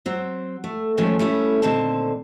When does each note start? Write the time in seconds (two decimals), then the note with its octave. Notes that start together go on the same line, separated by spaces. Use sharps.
0.06 F#3 C4
0.64 A3
0.97 A2 D#3 F3 G#3 A3 C#4
1.19 G3 A3 C#4 E4
1.62 A#2 D3 D#3 C4 C5 A5